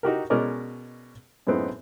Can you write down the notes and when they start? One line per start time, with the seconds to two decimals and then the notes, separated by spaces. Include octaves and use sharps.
0.03 D#4 F#4 G4 A#4
0.30 B2 G#3 C#4 A#4 D5 D#5
1.47 F#2 A2 G#3 B3 C4 D#4